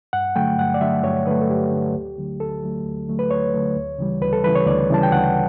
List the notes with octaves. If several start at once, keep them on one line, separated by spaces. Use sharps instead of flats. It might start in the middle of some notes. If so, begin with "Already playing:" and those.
G2 F#5
D3 F#3 A3 G5
G2 F#5
D5
D3 F#3 A3 E5
G2 C#5
D3 F#3 A3 B4
A4
G2 G4
D3 F#3 A3
D2
D3 F#3 A3
D2 A4
D3 F#3 A3
D2
D3 F#3 A3
B4
D2 C#5
D3 F#3 A3
D2
C#3 E3 G3
D2 B4
A4
C#3 E3 G3 B4
C#5
D2 D5
C#3 E3 G3 A5
G5
D2 F#5